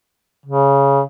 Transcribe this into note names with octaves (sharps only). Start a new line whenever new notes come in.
C#3